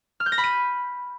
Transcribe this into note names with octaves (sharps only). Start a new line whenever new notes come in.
F6
G6
A#6
B5
D#7